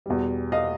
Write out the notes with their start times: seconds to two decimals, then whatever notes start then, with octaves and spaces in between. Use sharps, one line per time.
0.06 E2 B2 G3
0.52 D#5 F5